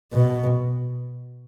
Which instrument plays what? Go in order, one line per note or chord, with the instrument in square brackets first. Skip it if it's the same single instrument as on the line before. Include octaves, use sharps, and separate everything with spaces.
[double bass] B2